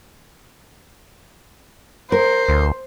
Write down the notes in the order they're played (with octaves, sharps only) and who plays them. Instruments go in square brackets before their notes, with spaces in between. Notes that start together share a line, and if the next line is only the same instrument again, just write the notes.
[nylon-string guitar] A#4 [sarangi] C5
[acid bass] D2